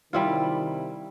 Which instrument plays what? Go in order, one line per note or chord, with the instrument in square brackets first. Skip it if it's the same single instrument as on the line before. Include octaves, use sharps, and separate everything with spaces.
[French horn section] C3 D#3 [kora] G3 E4 F4